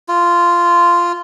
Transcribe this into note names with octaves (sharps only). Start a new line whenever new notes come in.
F4